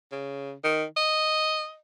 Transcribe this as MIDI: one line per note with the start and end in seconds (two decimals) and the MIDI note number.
0.12 0.53 49
0.64 0.84 51
0.97 1.76 75